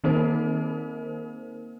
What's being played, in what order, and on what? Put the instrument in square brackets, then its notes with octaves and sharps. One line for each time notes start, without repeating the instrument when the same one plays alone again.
[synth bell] D#3 A#3 C4 D#4 A#4 C5